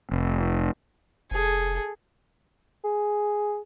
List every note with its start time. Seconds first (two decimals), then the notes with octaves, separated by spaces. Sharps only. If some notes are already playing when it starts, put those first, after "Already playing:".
0.11 F1
1.31 F1 G#4 A4
2.84 G#4